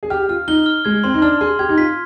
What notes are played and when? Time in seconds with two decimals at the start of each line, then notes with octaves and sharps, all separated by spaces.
0.03 G#4
0.10 G4 F6
0.29 F4 F6
0.48 D#4 G7
0.66 F6
0.85 G#3 G#6
1.04 C4 C6
1.14 D#4
1.22 D4 F6
1.41 G#4 C6
1.59 G4 G#6
1.69 D#4
1.78 F4 B6